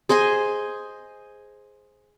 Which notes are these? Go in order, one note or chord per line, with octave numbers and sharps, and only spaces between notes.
G#4 C5 D#5 G#5